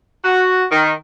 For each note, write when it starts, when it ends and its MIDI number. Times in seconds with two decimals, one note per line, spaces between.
0.25 0.64 66
0.71 0.92 51